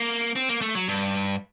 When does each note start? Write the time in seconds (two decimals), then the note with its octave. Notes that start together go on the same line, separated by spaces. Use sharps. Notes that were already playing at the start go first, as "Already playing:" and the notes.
Already playing: A#3
0.36 C4
0.49 A#3
0.61 A3
0.75 F#3
0.88 G2